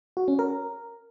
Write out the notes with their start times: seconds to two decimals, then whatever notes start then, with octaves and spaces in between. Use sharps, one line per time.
0.17 F#4
0.28 C#4
0.39 A#4